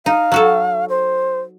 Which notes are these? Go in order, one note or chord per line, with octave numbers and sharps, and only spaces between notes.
D#4 F5
F#3 F#4 A4
C5